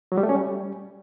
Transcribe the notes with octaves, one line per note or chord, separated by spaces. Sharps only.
F#3
G3
A3
C#4
G3